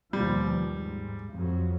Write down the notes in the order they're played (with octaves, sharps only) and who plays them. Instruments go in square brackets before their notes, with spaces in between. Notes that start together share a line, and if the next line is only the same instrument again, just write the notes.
[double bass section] D#2 B2 F3 [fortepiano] G3
[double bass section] G#2
F2 F#3